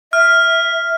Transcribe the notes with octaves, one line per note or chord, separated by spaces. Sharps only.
E5 F6